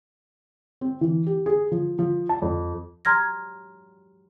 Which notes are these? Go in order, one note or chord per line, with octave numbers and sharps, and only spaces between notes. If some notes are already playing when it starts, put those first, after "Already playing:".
C4
E3
G4
G#4
F3
F3
A5
F2
A#5 C6 F6 G#6 A#6